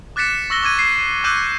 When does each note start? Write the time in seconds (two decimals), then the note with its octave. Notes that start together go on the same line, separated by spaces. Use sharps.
0.16 D6 F#6 A6 B6 C#7 E7
0.50 C#6 E6 A#6 G7
0.63 C#6 D6 F#6 G#6 D#7
0.79 C7
1.24 C#6 D6 E6 F#6 G6 D#7